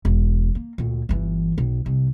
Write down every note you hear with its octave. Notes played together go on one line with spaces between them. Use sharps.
E1
A#3
D2 A#2
G1 E3
B1
C2